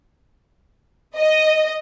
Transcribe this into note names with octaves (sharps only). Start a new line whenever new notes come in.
D#5